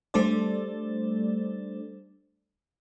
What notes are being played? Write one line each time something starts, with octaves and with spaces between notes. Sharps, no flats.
G3 A3 D4 A4 C5 D5